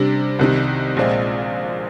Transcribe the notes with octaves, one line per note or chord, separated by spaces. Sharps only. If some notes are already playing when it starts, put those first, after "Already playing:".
Already playing: C3 G3 D4
C2 C3 D#3
A#1 A#2 G#3 C4